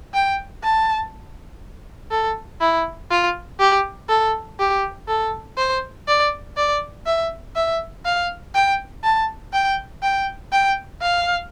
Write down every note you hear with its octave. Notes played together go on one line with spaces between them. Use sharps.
G5
A5
A4
E4
F4
G4
A4
G4
A4
C5
D5
D5
E5
E5
F5
G5
A5
G5
G5
G5
F5